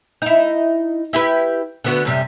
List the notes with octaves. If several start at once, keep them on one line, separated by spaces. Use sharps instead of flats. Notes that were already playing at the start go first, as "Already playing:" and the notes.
D#4 E4
E4 G4 B4
D3 B3 F#4
F#2 C3 G3